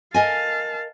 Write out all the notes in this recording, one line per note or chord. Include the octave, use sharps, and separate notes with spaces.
A#4 D#5 F5 G#5 A5